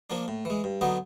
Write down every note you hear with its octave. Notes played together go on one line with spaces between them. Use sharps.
F3 A#3 D4
A2
E3 G#3
G2
D3 F#3 B3 D#4